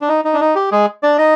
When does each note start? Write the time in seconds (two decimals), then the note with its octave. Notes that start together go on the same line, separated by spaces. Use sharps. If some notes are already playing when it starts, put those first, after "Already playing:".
0.01 D4
0.08 D#4
0.25 D#4
0.34 D4
0.41 D#4
0.56 G4
0.72 G#3 G#4
1.03 D4 D5
1.18 D#4 D#5